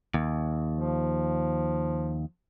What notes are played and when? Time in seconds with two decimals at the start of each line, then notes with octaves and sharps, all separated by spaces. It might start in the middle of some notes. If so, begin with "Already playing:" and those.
0.14 D#2
0.73 F3